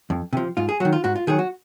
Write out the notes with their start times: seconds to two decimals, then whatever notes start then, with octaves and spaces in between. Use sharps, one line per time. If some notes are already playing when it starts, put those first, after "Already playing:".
0.10 F2
0.33 C3 F3
0.57 G#2 F4
0.69 G#4
0.80 F#3 F#4
0.85 D#3
0.93 F4
1.04 G#2 F#4
1.15 F4
1.27 D#3 F#3 G#4
1.39 F#4